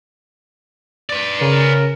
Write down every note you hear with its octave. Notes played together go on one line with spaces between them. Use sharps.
B4 D5
C#3 A#4